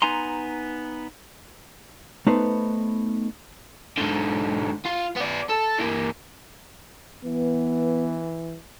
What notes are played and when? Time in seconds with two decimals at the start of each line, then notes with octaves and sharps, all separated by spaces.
0.02 B3 D#4 G#5 A#5 C6
2.27 A3 B3 D#4 B4 C5
3.98 G#2 D3
4.86 F4
5.17 B3 D5
5.49 A4
5.79 E3 A#3
7.25 E3 B3